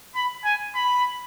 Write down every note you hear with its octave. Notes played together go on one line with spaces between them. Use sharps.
B5
G#5
B5